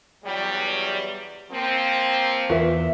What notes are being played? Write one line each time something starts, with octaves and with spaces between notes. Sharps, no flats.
E2 F#3 G3
F3 A#3 C4
E2 F4 A#4 B4 E5